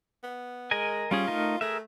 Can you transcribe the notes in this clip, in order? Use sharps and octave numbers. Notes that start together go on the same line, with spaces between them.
B3
G#3 A#4 D#5 G#5
G3 C#4 F4 G#4
A3 D#4 A#4
A3 G#4 A#4 E5